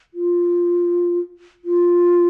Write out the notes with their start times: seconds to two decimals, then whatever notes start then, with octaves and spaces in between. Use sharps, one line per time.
0.14 F4
1.65 F4